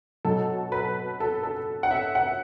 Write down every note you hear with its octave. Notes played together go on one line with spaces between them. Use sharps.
B2 F#3 A4
B4
A4
A4
F#5
E5
F#5